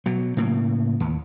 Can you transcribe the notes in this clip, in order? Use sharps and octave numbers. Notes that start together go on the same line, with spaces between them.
B2 F#3
A2 C#3 A#3
D#2